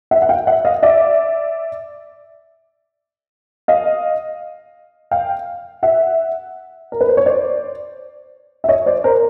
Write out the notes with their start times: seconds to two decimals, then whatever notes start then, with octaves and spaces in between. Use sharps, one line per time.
0.11 E5 F#5
0.22 F#5
0.29 F5 G5
0.47 E5 F#5
0.65 D#5 F5
0.83 D5 E5
3.68 D#5 F5
5.11 F5 G5
5.83 E5 F#5
6.92 A#4
7.01 B4
7.09 C5
7.17 C#5
7.26 C5 D5
8.64 E5
8.68 C#5 D#5
8.86 C5 D5
9.04 A#4 C5